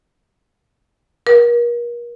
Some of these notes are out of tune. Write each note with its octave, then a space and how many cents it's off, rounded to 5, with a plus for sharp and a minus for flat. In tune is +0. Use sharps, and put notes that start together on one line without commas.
A#4 +35